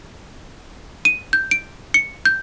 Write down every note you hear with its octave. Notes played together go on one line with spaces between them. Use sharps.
D#7
G6
D7
C#7
G6